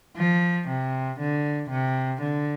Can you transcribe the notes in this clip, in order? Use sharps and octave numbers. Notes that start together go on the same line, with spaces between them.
F3
C3
D3
C3
D3